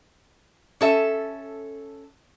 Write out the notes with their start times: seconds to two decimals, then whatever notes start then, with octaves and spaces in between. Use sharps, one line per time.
0.81 C#4 A4 E5